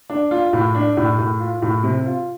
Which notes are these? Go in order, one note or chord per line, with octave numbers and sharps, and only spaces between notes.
D4
F4
A2
D4
A2
A2
F4
A2
C3
F4